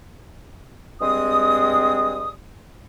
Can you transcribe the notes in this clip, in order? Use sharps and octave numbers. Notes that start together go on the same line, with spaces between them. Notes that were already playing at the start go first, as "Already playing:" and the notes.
G2 G#3 C4 D#6